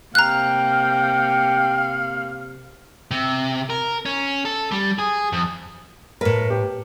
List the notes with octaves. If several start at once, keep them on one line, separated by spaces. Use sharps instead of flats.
C3 A#3 F5 G5 A#5 F#6
C3
A#4
C#4
A4
G3
G#4
F2
A2 A#4 B4
G4